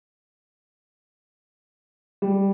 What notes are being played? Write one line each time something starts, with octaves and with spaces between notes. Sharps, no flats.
G3